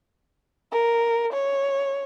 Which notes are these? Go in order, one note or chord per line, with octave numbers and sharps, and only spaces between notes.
A#4
C#5